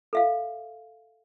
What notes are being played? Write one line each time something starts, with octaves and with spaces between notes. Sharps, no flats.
A4 E5 F5